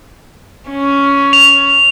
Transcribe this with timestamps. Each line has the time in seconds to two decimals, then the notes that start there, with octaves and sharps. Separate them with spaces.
0.69 C#4
1.33 F7